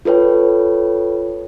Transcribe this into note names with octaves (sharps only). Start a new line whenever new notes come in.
F4 A4 B4 C#5 G5